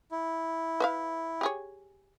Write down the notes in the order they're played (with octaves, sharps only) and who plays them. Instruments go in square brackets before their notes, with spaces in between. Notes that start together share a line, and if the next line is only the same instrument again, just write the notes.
[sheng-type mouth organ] E4
[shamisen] B4 E5 F5
G4 G#4 C#5